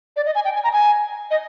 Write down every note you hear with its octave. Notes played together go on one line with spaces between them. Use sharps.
D5
D#5
G#5
G5
G#5
A#5
G#5
D#5